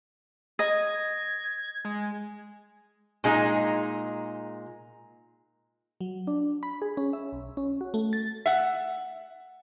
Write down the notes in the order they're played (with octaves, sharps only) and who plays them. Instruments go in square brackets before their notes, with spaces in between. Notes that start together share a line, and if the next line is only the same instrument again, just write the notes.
[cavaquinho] D#5 [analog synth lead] G#6
[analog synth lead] G#3
[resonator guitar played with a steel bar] A#2 G#3 D#4
[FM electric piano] F#3
D4
B5
G#4
C#4
E5
B1
C#4
F#4
A3
A6
[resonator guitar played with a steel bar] E5 F#5